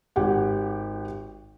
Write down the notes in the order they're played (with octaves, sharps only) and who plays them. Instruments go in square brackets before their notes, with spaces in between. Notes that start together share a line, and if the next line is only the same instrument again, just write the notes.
[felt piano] G#1 G4 F#5